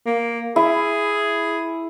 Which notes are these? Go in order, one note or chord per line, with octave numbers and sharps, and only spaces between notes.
A#3
E4 G#4